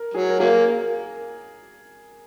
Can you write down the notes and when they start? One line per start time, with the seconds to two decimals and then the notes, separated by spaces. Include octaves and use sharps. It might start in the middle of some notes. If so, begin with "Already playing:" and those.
Already playing: A#4
0.14 F#3 G#4
0.29 A#4
0.40 F#3 A#3 G#4